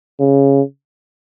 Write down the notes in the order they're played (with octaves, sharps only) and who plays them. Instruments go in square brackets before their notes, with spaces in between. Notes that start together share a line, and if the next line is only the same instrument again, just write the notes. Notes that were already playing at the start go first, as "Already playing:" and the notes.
[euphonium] C#3